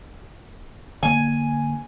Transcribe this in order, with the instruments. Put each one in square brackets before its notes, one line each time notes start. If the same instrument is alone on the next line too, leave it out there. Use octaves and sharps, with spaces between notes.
[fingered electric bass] D3 A#3 [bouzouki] G#5